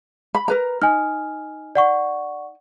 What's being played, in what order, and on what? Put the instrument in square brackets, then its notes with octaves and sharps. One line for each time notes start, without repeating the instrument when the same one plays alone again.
[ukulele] B5
A#4 B4 A#5
[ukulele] D#4 [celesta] G#5 F6
[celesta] D5 F#5 C#6